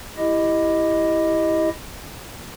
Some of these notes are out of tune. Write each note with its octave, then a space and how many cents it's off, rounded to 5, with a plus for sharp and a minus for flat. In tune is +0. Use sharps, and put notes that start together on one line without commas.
E4 +0 G4 +5 D#5 +0